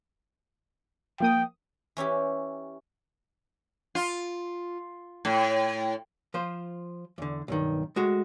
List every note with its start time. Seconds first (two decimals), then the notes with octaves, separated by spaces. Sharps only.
1.20 F3 A#3 G5 D#6
1.97 E3 C#4 E4 G4
3.95 F4
5.25 A2
6.34 F3 F4 C5
7.18 E2 D3
7.48 B1 G2 D#3
7.96 G#3 A3 F#4